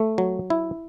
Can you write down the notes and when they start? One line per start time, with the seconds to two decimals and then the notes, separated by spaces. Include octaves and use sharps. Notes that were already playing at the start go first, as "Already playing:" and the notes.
Already playing: A3
0.18 F#3
0.50 E4